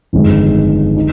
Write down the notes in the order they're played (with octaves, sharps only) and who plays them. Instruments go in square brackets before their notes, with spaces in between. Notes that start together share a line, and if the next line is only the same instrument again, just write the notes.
[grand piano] G1 F2 D#3 G#3
D#4